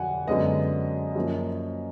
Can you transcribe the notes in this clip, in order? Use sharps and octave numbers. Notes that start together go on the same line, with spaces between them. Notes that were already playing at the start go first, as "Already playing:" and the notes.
Already playing: F2 D3 F#3 F#5 G#5
F#2 D3 G#3 B3 D#5
F#2 F3 A#3